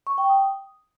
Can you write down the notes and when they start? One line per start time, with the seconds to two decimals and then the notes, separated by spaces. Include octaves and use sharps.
0.07 C#6
0.18 G5
0.29 D#6